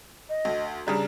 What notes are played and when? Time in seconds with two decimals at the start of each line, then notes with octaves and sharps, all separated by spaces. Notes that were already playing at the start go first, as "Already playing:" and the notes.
0.29 D#5
0.45 D2
0.87 C#3 G3 D4 A#5